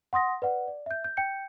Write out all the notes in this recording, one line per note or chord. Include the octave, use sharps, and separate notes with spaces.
F#5 C6 D#6 A#6
B4 D5 F#5
D5
E5 G6
G6
G5 G6 C#7